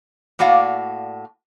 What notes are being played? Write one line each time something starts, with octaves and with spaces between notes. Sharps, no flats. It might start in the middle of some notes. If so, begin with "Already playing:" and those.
A2 A#3 F#4 D5 F5